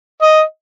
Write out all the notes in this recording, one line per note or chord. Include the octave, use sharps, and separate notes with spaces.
D#5